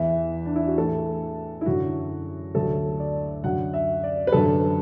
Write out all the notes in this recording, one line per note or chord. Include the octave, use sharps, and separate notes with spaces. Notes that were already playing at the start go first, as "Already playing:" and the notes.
Already playing: E2 E3 E5
D4
E4
F#4
A2 E3 A4
E4
F#2 D3 F#3 F#4
D2 D3 F#3 A4
D5
F#2 D3 F#3 F#5
E5
D5
B4
F#2 D3 F#3 A4